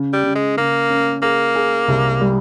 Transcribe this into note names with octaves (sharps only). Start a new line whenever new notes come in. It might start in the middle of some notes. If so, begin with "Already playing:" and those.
Already playing: C#3
G3
C#3
G#3
C#3 A#3
C#4
A#3 G#4
G#4
C2
G3